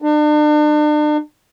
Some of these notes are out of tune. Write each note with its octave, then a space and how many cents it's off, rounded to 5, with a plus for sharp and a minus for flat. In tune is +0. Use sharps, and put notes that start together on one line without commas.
D4 +40